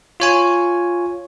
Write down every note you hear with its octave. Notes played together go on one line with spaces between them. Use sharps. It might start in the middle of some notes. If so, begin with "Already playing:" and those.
F4 C#5 G#5